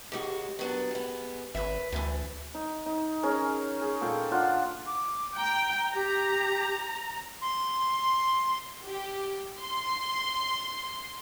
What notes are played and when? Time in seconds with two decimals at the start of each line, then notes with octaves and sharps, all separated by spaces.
0.12 D#2 G#3 F#4 G4
0.59 F#3 B3 D4
0.91 G#3 B3
1.55 G#1 B4 E5
1.92 D2 D3 E3
2.54 D#4
2.86 D#4
3.23 C#4 D#4 G#4 A#4
3.81 G#4
4.01 A#2 A4 G5
4.31 D4 F4 F#5
4.87 D6
5.37 G5 A#5
5.95 G4 A#5
7.41 C6
8.85 G4
9.61 C6